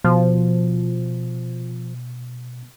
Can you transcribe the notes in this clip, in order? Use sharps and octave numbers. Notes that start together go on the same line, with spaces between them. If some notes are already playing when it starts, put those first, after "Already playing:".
B2 F3